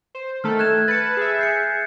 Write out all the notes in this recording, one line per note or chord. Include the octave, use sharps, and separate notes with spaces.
C5
D#3 A3 A4 F6
F#6 G#6 E7
B4 A5 A6 C#7
G#4 E5
G6 C7 C#7